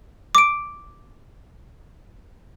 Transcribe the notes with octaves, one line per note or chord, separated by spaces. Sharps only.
D6 D7